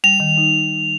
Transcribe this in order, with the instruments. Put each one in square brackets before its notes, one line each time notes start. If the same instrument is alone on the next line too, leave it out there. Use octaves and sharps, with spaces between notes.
[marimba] G3 [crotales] F7
[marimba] D#3
D#4